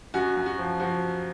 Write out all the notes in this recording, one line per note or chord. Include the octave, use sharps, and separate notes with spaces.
F#2 F#4
F#2
F#4
F3
F3 F#4